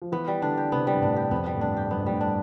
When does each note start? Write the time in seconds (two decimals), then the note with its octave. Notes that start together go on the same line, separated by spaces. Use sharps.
0.02 F3
0.12 E3 B3
0.28 G3
0.42 D3 D4
0.57 G4
0.72 C3 B3
0.87 G3
0.94 G2
1.02 A2 D4
1.16 G4
1.31 F2 B3
1.46 G3
1.55 A2
1.61 G2 D4
1.77 G4
1.91 G2 B3
2.02 A2
2.06 G2 G3
2.21 D4